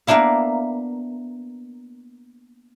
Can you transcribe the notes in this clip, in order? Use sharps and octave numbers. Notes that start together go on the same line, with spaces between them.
A#3 B3 D4 E4 F5